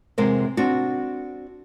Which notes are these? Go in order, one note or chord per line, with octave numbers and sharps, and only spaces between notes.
E2 C3 G#3 A#4 C5
C4 D4 F#4